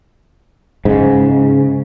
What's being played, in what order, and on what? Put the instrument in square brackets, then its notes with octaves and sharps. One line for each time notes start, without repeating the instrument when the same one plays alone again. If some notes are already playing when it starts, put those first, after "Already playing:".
[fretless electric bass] G#2 [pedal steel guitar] C#3